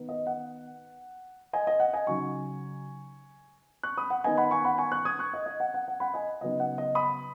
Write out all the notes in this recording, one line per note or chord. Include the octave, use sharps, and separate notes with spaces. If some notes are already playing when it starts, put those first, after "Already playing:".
Already playing: D#3 B3 D#4
D#5
F#5
D#5 G#5
D#5
F#5
D#5 G#5
C#3 F#3 D#4 G#5 C#6
C#6 F#6
B5 D#6
F#5
D#3 B3 D#4 D#5 G#5
F#5 B5
G#5 C#6
F#5 B5
G#5 C#6
C#6 F#6
D#6 G#6
C#6 F#6
D#5
D#5
F#5
F#5
F#5
F#5 B5
D#5 G#5
C#3 F#3 B3 D#4 D#5
F#5
D#5
B5 D#6